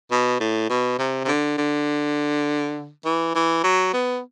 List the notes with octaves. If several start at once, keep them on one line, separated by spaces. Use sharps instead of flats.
B2
A2
B2
C3
C3
D3
D3
E3
E3
F#3
B3